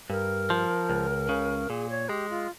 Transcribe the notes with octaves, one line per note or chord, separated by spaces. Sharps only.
G2 A#4
F3
C#2
C#3
A#2 G#4
C#5
G#3 G4
F4